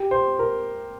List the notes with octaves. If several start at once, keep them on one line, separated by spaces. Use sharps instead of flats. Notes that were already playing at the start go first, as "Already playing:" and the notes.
Already playing: G4
C5
A#4